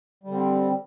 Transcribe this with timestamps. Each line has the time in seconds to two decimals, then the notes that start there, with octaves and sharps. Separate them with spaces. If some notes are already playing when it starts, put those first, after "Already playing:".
0.24 G3
0.27 D3
0.31 C4